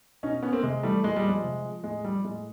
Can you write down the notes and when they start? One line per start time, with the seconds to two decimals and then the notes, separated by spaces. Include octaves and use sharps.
0.23 B2 C#4 D#4
0.43 B3 C#4
0.53 A#3 C4
0.63 C3 G#3
0.83 E3 G3 A3
1.03 A#2 G#3
1.16 G3
1.24 F3 G#3
1.44 C3
1.63 F3
1.84 A2 G#3
2.04 F3 G3
2.24 A2 G#3